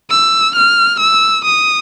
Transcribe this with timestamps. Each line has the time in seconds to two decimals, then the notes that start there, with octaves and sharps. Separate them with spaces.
0.11 E6
0.56 F6
1.00 E6
1.45 D#6